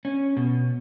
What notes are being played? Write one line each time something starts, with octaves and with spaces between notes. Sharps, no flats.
C#4
B2